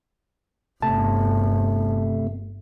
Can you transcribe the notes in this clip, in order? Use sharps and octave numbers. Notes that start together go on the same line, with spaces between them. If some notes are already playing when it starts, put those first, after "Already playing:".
G1 C3 A3 A5